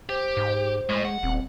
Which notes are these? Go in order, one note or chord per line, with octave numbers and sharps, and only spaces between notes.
G4 C5
G#2
A2 G#3
F#5
D#1 C4